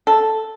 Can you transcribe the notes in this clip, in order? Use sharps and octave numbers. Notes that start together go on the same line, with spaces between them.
A4